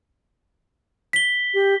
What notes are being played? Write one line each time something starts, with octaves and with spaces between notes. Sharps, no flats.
B6 G7
G4